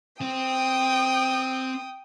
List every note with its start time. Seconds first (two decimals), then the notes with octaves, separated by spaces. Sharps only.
0.21 C4 G5 D#6